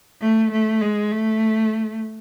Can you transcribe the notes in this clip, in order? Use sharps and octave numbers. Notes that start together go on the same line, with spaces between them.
A3
A3
G#3
A3